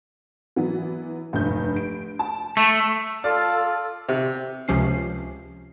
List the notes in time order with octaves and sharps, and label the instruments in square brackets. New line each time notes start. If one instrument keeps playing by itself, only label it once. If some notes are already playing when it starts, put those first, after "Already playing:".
[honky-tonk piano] E3 F#3 B3
F1 G2 G6
D7
A5
[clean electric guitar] A3
[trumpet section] F4 A5 [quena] A4 [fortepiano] D5 [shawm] F5
[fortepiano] C3
[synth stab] C#2 C3 F3 C#4 C7